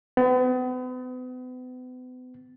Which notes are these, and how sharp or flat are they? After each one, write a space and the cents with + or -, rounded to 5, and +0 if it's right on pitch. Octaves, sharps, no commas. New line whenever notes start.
B3 +40